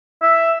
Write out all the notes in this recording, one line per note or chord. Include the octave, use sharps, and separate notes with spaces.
E5